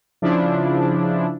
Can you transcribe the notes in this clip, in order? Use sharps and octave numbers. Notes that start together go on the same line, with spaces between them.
C#3 F3 D4 E4